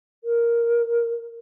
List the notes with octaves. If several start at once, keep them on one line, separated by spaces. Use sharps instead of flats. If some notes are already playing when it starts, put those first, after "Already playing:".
A#4